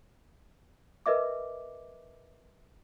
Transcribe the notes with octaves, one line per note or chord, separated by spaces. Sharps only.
A#4 B4 D#5 E5 D6